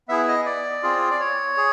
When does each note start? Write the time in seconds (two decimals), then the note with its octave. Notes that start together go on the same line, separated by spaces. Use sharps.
0.08 B3 E4 G#4 E5
0.28 D#5
0.46 D5
0.83 C4 F4 G#4
1.11 D5
1.20 C#5
1.57 G#4